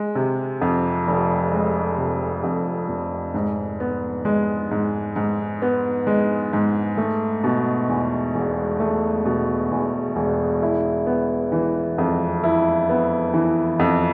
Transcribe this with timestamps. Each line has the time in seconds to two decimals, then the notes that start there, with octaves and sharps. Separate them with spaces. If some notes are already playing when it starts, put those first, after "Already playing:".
Already playing: G#3
0.15 C3
0.61 F2
1.07 F1
1.52 G#3
1.98 C3
2.44 F2
2.89 F1
3.34 G#2
3.80 B3
4.25 G#3
4.71 G#2
5.16 G#2
5.62 B3
6.07 G#3
6.53 G#2
6.97 A3
7.44 B2
7.89 E2
8.34 E1
8.80 A3
9.26 B2
9.71 E2
10.16 E1
10.62 E4
11.07 B3
11.52 E3
11.98 F2
12.44 E4
12.89 B3
13.34 E3
13.79 F2